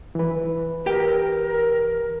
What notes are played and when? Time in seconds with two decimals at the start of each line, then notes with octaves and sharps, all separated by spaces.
0.15 E3 B4
0.86 G4 A#4 G5